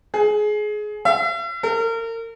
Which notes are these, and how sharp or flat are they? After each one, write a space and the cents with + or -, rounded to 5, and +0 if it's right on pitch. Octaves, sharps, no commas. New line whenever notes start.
G#4 +20
E5 +45
A#4 -35